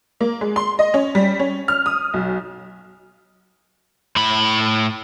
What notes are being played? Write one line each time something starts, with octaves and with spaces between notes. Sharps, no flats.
A#3
G#3
C6
D#5
C#4
G3
C#4
F6
D#6
B1
A2 B5